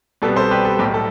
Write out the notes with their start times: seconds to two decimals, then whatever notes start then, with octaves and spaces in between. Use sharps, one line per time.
0.22 C2 B2 G3 B3 A4
0.36 A4 C5
0.51 G4 B4
0.65 A4
0.79 B1 A2 G3 G4
0.94 A4